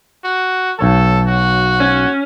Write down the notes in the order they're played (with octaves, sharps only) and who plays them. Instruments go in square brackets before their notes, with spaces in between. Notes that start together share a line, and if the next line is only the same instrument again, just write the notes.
[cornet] F#4
[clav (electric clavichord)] B1 C#5 A5 [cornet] A4
[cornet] F#4
[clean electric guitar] C#4